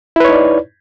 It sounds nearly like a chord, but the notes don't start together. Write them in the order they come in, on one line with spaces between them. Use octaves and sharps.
E4 B4 C#5 D#4 D5